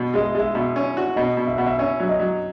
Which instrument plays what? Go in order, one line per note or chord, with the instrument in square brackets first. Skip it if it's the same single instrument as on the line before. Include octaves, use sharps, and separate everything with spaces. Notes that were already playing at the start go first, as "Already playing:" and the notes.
Already playing: [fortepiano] B2
[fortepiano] G#3 [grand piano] D#5
[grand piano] E5
[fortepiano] G#3 [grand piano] E5
[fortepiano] B2 [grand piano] E5
[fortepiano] C#4
F#4
[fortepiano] B2 [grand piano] D#5
[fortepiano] B2
[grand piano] E5
[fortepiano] B2 [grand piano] F#5
[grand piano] E5
[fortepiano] C#4 [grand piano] E5
[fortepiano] F#3
[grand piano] D#5
[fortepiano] F#3